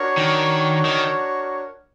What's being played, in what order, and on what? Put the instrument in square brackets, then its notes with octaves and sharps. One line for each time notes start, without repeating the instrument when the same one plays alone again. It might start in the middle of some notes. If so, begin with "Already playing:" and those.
Already playing: [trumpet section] D4 F#4 A#4 C#5
[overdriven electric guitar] D#3
D#3